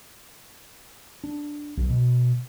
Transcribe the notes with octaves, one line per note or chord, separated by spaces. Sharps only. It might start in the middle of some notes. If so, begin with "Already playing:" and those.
D4
B1
B2